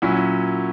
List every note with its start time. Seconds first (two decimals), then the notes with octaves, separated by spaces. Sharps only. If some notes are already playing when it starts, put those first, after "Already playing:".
0.02 A#2 F#3 C#4 E4